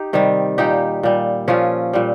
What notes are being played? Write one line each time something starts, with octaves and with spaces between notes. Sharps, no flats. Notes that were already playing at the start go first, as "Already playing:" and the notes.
Already playing: D#4 G4
C3 D#3 G3
A#2 G3 D#4 G4
A#2 G3
A#2 F3 C#4 F4
A#2 G3